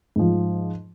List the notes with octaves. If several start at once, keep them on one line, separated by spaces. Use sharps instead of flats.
G#2 F3